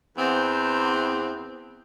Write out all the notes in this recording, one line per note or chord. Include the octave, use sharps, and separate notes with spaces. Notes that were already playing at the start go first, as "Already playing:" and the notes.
E2 C4